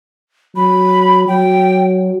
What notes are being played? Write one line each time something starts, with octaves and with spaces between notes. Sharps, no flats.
F#3 B5
F#3 G5